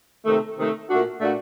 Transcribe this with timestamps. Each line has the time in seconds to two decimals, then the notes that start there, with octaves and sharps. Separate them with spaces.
0.25 C3 D#3 A3
0.57 C3 D#3 A3
0.88 A#2 A3 D4 F#4
1.20 A#2 A3 D4 F#4